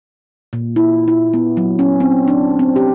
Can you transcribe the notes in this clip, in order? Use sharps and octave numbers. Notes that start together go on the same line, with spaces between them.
A#2
E4
E4
B3
F#3
C#4
C4
D4
C4
G4